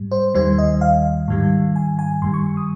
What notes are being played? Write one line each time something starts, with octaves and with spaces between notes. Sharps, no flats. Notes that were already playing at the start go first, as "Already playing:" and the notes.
Already playing: G#2 G3
C5
D#2 D#3 G3 C5
D#5
F5
G#2 D#3 G3
G#5
G#5
G2 D#3 G3 C6
C#6
D#6